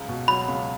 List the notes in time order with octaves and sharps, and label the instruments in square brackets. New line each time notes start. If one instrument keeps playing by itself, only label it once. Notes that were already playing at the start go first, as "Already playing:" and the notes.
Already playing: [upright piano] C#2
B2
[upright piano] F#3 [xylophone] B5
[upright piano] C#2